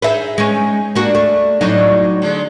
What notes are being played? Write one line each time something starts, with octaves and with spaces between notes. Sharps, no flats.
D#4 G#4 B4 E5
G#3 C#4 D#4
A#3 D4 F#4
A3
A2 F#3 D4 D#4
D3 G#3